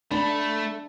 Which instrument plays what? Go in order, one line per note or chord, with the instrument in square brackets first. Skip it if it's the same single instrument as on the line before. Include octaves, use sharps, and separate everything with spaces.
[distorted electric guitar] A3 [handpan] D4 [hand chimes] B5